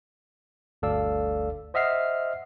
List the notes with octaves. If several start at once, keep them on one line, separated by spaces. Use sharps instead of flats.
G1 D2 A4 D5 F5 E6
C5 D#5 E5 F#5 F6 C7